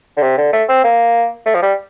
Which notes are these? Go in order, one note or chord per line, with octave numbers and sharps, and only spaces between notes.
D3
C3
D3
A3
C4
A#3
A3
F3
G3